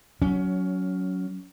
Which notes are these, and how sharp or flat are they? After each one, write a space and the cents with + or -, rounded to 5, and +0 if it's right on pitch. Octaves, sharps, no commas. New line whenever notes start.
F#3 +0 C#4 +20